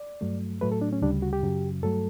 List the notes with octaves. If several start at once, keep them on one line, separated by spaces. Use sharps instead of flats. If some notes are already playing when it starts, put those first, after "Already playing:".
Already playing: D5
G2 F#3 A3
A2 F#3 A3 B4
A4
D4
C#4
D2 C#3 G3 D4
F#4
G4
F#2 C#3 F#3
G2 F#3 A3 A4